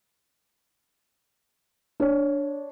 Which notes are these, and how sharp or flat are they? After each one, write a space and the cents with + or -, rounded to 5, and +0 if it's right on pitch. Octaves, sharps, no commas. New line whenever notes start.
D4 -10 C#5 +0